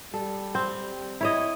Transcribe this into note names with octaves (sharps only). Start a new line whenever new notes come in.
G3 A4
C4
E4 C#5 D#5